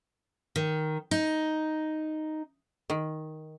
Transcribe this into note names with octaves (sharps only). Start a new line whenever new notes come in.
D#3
D#4
D#3